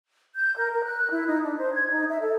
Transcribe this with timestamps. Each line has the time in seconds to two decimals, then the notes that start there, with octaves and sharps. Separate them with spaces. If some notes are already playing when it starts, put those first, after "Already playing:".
0.35 G6
0.56 A#4
0.72 A#4
0.84 F#6
1.11 E4
1.27 D#4
1.43 D4
1.57 C5
1.73 G#6
1.90 D#4
2.09 E5
2.21 A4